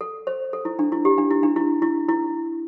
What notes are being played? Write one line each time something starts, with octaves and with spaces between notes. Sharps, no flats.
A4
C5
A4
E4
D4
E4
G4
D4
E4
D4
E4
E4
E4